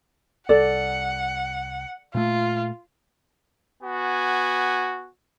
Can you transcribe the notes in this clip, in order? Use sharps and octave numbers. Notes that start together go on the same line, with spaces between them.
C2 A4 D5 F#5
A#2 A3 F4
B3 F#4 G#5